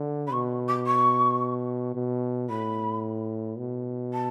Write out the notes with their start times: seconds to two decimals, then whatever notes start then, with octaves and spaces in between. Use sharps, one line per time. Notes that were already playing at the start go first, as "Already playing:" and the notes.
Already playing: D3
0.27 B5
0.32 B2 C#6
0.68 D6
0.86 C#6
1.95 B2
2.49 A2 B5
3.58 B2
4.13 A5